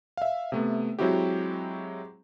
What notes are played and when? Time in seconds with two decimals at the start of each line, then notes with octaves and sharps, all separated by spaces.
0.17 E5 F5
0.52 C3 A3 B3
0.99 F#3 G#3 C4 E4 F#4 G4